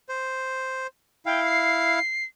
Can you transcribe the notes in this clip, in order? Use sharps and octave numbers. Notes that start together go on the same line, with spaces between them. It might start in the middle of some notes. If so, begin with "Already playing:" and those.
C5
E4 F5 G5
C7